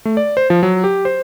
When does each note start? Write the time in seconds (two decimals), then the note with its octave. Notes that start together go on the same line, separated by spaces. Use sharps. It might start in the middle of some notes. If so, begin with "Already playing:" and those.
0.05 A3
0.17 D5
0.37 C5
0.50 F3
0.63 F#3
0.84 G4
1.05 C5